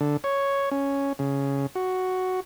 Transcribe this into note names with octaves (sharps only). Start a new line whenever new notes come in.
D3
C#5
C#4
C#3
F#4